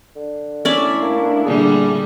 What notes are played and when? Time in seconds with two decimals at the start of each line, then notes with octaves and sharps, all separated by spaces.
0.16 D3
0.65 A3 C#4 D4 E4 D5 E5
1.02 A#3
1.45 A#2 D3 G3 G#4